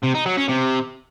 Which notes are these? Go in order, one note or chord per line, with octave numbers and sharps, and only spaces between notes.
C3
D#4
F#3
C#4
C3